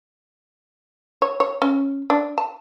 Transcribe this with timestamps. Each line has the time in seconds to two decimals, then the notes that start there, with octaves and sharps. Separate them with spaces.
1.22 C#5
1.40 C#5
1.62 C#4
2.10 D4
2.38 A5